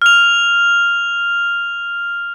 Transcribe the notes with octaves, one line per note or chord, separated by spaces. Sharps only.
F6 F7